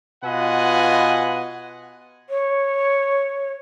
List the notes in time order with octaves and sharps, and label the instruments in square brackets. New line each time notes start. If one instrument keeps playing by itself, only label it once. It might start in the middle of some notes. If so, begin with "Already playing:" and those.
[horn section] B2 F4 B4 D#5 F#5 G#5
[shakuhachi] C#5